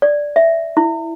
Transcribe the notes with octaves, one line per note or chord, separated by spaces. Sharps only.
D5
E5
E4